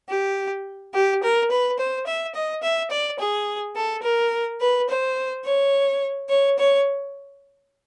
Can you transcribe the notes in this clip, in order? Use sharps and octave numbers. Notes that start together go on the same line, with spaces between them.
G4
G4
A#4
B4
C5
E5
D#5
E5
D5
G#4
A4
A#4
B4
C5
C#5
C#5
C#5